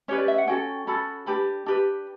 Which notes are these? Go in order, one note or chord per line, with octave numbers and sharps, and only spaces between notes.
C#4 G4 B4 C#5
D5
E5
F#5
C#4 F#4 A4 G5
C#4 F#4 A4 B5
D4 G4 B4 B5
D4 G4 B4